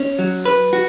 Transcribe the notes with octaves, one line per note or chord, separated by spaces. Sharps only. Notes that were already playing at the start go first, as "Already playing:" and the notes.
Already playing: C#4
F#3
B4
F#4